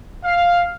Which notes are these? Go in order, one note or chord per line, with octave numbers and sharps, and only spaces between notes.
F5